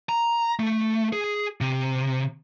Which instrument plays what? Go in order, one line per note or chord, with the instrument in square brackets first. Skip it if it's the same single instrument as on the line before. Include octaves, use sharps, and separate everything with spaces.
[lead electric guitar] A#5
A3
G#4
C3